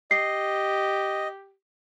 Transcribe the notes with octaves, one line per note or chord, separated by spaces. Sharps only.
G4 D#5 C7